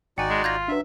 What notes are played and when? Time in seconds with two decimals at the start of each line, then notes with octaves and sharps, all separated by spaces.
0.18 G#1 D#4 F#4 D5 G5 G#5
0.30 G#3
0.44 F4 G6 G#6 A#6
0.68 F#3 D4 B4 E5